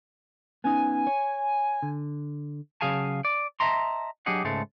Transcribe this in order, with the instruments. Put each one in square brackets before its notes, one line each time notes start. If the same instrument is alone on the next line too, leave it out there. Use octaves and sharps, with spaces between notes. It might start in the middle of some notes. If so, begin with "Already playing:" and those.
[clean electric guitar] B3 C#4 D#4 [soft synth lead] G#5
[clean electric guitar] C#5
D3
C#3 F#3 G#4 F5 G#5 A5
D5
D#5 E5 A5 A#5 C6
F#3 D4 G4 G#4 D#5 F#5
C#2 G#2 G#3 A3 A4